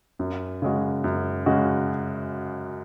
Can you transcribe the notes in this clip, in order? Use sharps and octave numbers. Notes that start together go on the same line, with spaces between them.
F#2
C#3 G#3 F#4
F#2
C#3 G#3 F#4